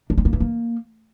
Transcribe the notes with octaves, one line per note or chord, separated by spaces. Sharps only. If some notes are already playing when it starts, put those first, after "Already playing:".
D4
C4
A#3
E3
A#3